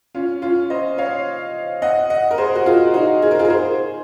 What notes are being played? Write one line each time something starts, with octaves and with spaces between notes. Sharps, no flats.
C#4 F4
C#4 F4
C5 D#5
C#5 F5
D#5 F#5
D#5 F#5
A#4
G#4 C5
F#4
F4 G#4
D#4 F#4
G#4
A#4
F4 G#4
A#4
G#4 C5